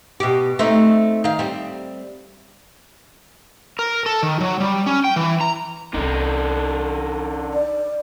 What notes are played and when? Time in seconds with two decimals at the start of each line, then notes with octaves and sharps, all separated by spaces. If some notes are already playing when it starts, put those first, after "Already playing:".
0.20 B2 G4
0.59 A3 C4 D#4
1.24 D#3 F5
1.39 G3 C4
3.79 A#4
4.06 A4
4.23 D#3
4.41 F#3
4.60 G3
4.86 C#4
5.04 G5
5.16 E3
5.41 A#5
5.94 C2 D3 F#3 D#4
7.54 D5